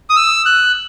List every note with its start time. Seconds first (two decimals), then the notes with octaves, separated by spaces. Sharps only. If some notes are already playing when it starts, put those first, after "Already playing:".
0.10 D#6
0.16 E6
0.45 F#6